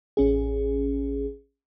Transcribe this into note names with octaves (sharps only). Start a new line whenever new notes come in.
A1 C#4 G#4